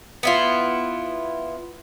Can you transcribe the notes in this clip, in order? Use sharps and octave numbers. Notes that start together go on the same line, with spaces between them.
B3 E4 F4